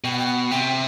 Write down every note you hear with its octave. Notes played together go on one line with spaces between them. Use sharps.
B2 G5
F#5
G5
F#5
C3 G5